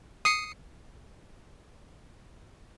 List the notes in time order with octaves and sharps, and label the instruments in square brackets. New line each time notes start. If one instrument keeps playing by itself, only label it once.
[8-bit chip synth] D#6 C7 C#7